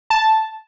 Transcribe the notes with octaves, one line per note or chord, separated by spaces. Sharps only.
A5